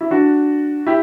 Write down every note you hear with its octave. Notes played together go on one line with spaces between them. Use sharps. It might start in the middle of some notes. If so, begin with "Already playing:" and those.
E4
D4 F#4
E4 G4